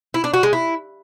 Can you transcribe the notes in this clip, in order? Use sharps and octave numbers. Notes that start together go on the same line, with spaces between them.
E4
D4
F#4
G#3
E4